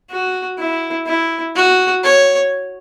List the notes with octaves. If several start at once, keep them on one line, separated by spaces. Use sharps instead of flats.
F#4
E4
E4
F#4
C#5